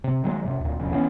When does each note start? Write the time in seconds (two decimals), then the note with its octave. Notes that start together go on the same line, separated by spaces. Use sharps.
0.04 C3
0.24 D#3 F#3 G#3
0.44 F#2 C3
0.61 D2 A#2
0.80 E1 C2 F2 C#3
0.91 E3 B3 C#4